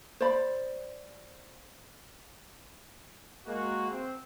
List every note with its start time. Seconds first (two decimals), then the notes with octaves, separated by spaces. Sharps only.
0.20 C5 D5 B5
3.46 G#3 A#3 F#4
3.90 C4